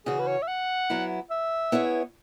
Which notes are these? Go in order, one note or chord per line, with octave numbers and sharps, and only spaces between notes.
C#3 E3 C#4 F#4 G#4
B4
C#5
E5
F#5
F#3 B3 E4
E5
B3 E4 G#4 C#5